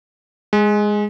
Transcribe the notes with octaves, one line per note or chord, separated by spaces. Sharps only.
G#3